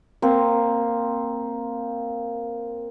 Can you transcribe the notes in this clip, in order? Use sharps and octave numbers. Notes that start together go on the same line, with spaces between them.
A#3 C4